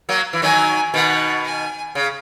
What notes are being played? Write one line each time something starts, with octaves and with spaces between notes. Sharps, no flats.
F#3 A#3
E3
D#3 F#3 G#5
B2 D#3 F#5
G#5
C#3